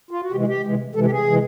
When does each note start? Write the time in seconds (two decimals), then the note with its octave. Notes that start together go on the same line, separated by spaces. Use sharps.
0.11 F4
0.22 F#4
0.31 C3 E3 G#3 G4
0.48 G4
0.64 C3 E3 G#3
0.95 C3 E3 G#3 A4
1.06 G4
1.11 G#4
1.26 C3 E3 G#3